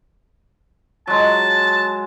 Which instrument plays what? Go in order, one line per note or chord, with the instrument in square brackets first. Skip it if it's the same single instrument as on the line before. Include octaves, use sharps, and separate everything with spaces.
[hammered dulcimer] F#3 G#3 [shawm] A5